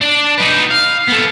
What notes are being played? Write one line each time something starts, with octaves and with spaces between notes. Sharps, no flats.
D4 D5
D#4 B4
F5
B3 A4